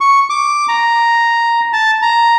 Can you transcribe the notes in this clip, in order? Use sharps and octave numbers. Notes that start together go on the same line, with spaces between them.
C#6
D6
A#5
A5
A#5